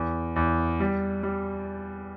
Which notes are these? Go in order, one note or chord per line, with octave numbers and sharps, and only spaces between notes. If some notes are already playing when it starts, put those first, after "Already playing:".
Already playing: E2
E2
G3
G3